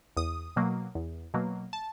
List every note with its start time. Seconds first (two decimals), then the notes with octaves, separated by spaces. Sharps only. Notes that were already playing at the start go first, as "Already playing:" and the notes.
0.17 E2 D#6
0.56 B2 F#3 A#3
0.95 E2
1.34 B2 F#3 A#3
1.73 A5